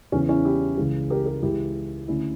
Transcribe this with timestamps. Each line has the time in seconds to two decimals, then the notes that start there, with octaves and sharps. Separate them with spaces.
0.12 E2 C#3 E3 C#4
0.29 C#4 E4
0.45 E4 G4
0.78 C#2 C#3 E3
1.10 G4 A#4
1.26 G4 A#4
1.42 C#2 C#3 E3 E4 G4
2.08 D2 D3 C#4 E4